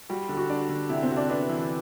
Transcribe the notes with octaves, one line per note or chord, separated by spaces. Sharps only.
G3 F#4
D3
F#4
D4
D3
C3 E4
C4
F#4
D4
B3 D4
E3